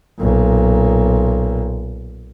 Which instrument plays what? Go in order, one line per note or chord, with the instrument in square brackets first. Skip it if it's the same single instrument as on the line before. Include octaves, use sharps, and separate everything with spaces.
[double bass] B1 A#2